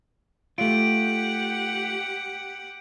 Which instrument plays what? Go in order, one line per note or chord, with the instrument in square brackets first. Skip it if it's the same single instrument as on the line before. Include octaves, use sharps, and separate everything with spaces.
[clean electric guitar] A3 F4 [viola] G4 F#5 [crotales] D7